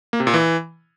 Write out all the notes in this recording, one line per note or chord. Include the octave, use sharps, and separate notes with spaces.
A#3
C3
A#2
E3